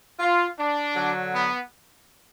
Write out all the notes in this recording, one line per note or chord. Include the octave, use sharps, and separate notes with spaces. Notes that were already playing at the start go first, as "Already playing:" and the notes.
F4
D4
D3 F#3
B3